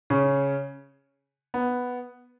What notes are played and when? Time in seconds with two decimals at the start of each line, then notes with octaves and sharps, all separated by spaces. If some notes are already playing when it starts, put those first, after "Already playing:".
0.10 C#3 C#4
1.54 B3